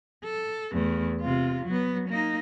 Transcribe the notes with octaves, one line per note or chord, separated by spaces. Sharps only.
A4
E2 A3
C3 F4
F#3 B3
A#3 D#4